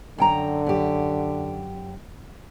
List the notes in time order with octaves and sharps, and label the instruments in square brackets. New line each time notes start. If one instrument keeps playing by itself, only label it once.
[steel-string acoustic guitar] F#2 G5 A#5 [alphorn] D3
[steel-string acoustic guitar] F#2 G4